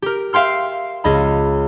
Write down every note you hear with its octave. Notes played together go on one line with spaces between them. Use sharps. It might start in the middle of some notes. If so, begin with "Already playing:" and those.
G4 A#4
E5 F5 G5 C6 F6
C#2 D#5 B5